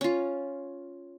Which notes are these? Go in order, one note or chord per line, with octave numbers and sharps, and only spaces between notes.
C#4 F4